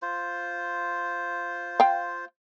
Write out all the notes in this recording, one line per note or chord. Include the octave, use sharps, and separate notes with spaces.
F4 C5
F5 G5